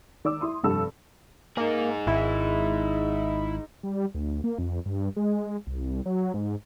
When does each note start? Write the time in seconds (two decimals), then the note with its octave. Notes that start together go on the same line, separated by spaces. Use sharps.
0.25 D#3 D5 D6 E6
0.41 E4 C6 D#6
0.63 F1 G2 A4 E6
1.57 A#3 D#4 G#4
2.07 G#1 E4
3.83 G3
4.15 D2
4.44 A#3
4.58 F2
4.86 G2
5.16 G#3
5.67 C2
6.06 F#3
6.34 G#2